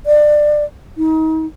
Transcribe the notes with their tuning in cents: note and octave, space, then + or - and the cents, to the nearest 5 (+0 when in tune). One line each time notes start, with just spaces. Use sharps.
D5 +25
D#4 +35